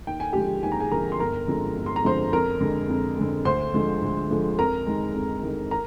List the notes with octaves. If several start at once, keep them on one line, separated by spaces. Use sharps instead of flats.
D#2 G5
G#5
D3 F3 G#3 G4 G5
D#2 G#5
A#5
G#4 G#5
D3 F3 G#3 A#4 A#5
C6
G1 A#4 A#5
F2 D3 F3 G#3
G1
C6
A#5
F2 D3 F3 G#3 C5 C6
F2 A#4 A#5
D3 G#3
F2
D3 G#3
D2 C5 C6
D3 F3 G#3
D2
D3 F3 G#3
F2 A#4 A#5
D#3 G#3
F2
D#3 G#3
A#4 A#5